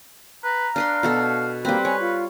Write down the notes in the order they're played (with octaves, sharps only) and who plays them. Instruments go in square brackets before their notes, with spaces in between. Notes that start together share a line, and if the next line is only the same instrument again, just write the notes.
[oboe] B4 [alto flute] A#5
[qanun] D4 B4 C6 [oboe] F5
[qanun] B2 F#4 A4
[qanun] G3 C4 [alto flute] A#3 [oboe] B4
[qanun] C#5 [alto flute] G#5
[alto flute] F4